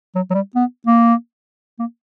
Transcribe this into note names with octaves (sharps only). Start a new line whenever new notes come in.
F#3
F#3
G3
B3
A#3
A#3